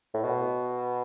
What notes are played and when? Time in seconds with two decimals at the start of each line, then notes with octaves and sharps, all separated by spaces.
0.14 A2
0.24 B2